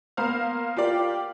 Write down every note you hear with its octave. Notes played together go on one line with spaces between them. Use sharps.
A#3 B3 C5 F5 A#5 F6
F4 G4 A#4 D5 F5